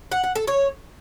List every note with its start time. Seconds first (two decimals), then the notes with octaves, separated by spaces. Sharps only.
0.12 F#5
0.24 F#5
0.35 A4
0.47 C#5